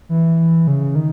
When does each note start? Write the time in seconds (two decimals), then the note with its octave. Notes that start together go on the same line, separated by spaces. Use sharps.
0.09 E3
0.67 C#3
0.95 D#3